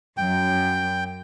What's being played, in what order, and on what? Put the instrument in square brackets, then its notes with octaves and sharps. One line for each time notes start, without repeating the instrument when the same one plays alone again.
[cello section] F#2 [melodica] G5